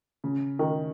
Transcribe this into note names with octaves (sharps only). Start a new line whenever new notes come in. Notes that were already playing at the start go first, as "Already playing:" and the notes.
C#3
D#3